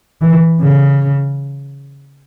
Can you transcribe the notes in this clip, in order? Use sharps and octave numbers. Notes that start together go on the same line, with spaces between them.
E3
C#3